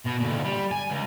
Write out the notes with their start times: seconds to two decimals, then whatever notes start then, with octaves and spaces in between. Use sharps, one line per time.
0.06 B2
0.20 D2 A#2
0.45 G3
0.71 G#5
0.90 C#2